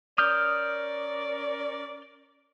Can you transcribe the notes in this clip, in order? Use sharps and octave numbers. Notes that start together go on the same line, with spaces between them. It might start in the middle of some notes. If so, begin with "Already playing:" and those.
C#4 A#4 D5 D#6 F6 G6